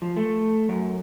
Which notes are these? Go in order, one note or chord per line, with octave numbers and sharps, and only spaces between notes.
F3
A3
F#2